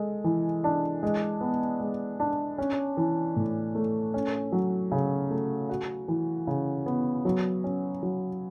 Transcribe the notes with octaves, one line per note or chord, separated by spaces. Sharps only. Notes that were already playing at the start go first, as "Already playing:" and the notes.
Already playing: G#3 A4
E3
D4
G#3
B3
G#3
D4
C#4
E3
A2
A3
C#4
F#3
C#3
A3
F#4
E3
C#3
B3
F#3
C#4
F#3